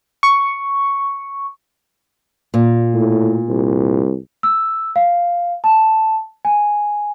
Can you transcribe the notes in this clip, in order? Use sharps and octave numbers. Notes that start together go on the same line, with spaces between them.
C#6
A#2
A2
C2
E6
F5
A5
G#5